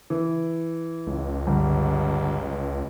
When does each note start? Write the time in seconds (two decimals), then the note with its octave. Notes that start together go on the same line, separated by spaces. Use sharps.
0.10 E3
1.07 C#2
1.47 G1